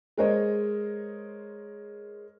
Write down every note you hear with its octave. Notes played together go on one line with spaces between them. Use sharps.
G#3 G#4 A#4 C5 C#5 D#5